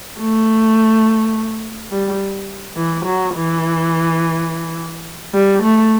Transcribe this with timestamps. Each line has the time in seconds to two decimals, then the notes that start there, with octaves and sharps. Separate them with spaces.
0.20 A3
1.92 G3
2.77 E3
3.05 F#3
3.35 E3
5.34 G3
5.62 A3